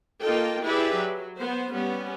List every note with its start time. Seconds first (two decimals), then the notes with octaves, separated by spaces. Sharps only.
0.21 A#3 D#4 F4 A4 G5
0.65 E4 G4 G#4 B4 D5 E5
0.96 F#3
1.38 B3 C5
1.72 G3 B3 C#4